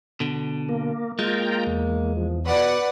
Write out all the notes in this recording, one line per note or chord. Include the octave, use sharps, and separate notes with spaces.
B2 D3
A#3
G#3 A#3 F4 G5 A#5
E2
F3
B2 B4 D5 F#5